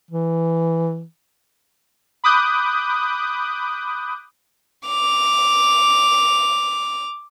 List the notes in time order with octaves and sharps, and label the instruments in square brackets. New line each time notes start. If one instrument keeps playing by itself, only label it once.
[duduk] E3
[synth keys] B5 D6 D#6 F#6 G6
[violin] D6 F7